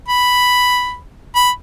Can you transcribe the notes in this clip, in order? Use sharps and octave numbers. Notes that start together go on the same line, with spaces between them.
B5
B5